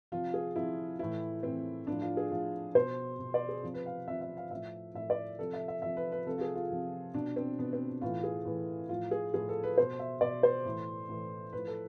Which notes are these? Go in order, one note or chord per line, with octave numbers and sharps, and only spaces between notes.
C3 F3 F4
G#4
C3 F3 E4
A2 E3 E4
A2 E3 C4
A2 F3 D4
F4
G#4
A2 F3 F4
B2 C5
B2
D5
G#4
C3 F3
B4
F5
C3 F3 E5
E5
F5
A2 F3 E5
A2 F3 E5
D5
C3 F3 A4
E5
E5
C3 F3 E5
B4
B4
C3 F3 A4
F4
G#4
F4
C3 F3
B2 D4
C4
B2 B3
C4
A2 E3 F4
G#4
A2 E3
A2 F3 F4
G#4
A2 F3 G#4
A4
B4
B2 C5
E5
B2 D5
C5
A2 E3
A2 E3
A2 F3 B4
A4